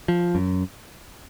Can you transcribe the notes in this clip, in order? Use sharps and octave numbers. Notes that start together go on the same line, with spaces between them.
F3
F#2